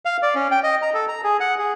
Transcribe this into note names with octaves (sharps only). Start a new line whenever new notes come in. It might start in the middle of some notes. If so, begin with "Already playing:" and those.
F5
D5
C#4
G5
D#5
A#5
A4
A#5
G#4
F#5
G#4